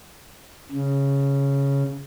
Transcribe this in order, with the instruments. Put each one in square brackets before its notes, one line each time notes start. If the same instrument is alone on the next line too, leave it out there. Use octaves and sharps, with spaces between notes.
[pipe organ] C#3